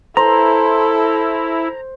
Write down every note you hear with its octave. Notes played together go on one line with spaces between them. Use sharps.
E4 A4 C5 A#5